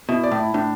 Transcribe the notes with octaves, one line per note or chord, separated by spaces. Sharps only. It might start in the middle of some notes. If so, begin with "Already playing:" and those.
B2 E4
D5
A2
E4
A2 D4